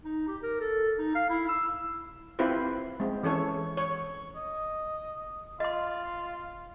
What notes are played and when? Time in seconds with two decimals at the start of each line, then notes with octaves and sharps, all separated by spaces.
0.04 D#4
0.27 G4
0.43 A#4
0.61 A4
0.98 D#4
1.15 F5
1.30 E4
1.49 E6
2.39 C4 E4 F4 G4 B4 C5
3.00 G#3 C4
3.23 E3 C#4 A4 C#5
3.77 C#5
4.36 D#5
5.60 F4 D#5 C6